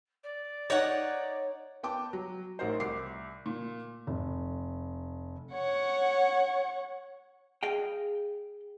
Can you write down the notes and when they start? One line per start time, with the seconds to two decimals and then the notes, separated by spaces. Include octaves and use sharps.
0.23 D5
0.70 D#4 C#5 F#5
1.83 B3 G5 A5 D6
2.13 F#3
2.59 A1 D#4 F#4 A#4 C5
2.80 C2 D6 C7
3.46 A#2
4.07 F1
5.53 C#5 F#5
7.63 G#4 D#5 F5 G5